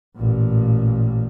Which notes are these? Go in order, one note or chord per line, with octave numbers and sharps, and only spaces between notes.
A1 A#2